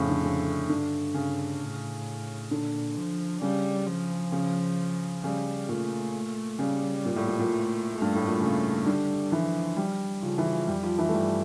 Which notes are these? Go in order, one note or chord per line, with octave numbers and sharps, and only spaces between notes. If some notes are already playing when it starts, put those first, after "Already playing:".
Already playing: F2 A2 C#3
D3
C#3
G2 D3
C#3
A2
A#2 D3
F3
C#3 G3
F3
C#3
C#3 G3
A#2 A3
C#3 G3
A#2
A2
A#2
A#2
A3
A3
G2
A2
A#2
C#3
D3 G3
E3 F3
G3
C#3 F3
E3
F3
F2 G3
F3
E3
A3
G2 G3